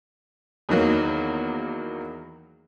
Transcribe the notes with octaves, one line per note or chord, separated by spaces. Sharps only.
E2 D#3 F#3 A#3